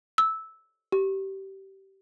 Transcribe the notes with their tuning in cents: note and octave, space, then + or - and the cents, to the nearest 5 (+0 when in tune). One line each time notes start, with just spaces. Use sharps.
E6 -10
G4 -20